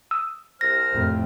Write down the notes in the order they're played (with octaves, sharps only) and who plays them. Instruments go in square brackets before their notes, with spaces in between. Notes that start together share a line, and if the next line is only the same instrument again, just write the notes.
[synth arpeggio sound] D#6 E6
[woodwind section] C2 C5 F6 [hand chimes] A#6
[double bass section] F2 A2